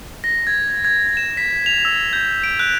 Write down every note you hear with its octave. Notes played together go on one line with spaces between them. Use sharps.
A#6
G#6
G#6
E7
B6
F7
E6
G6
D7
F#6